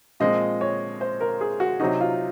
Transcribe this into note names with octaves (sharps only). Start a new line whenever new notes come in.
A#2 F3 G#3 C4 D#5
C#5
C5
A#4
G#4
F#4
C3 F#3 C4 D#4 F#4
F4